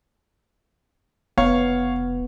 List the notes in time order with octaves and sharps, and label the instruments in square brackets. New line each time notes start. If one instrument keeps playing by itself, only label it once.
[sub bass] F1 [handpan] B3 [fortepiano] C#5 F5 C#6